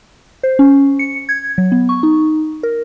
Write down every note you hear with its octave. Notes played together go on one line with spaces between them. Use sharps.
C5
C#4
C#7
G#6
F#3
B3
C#6
D#4
A#4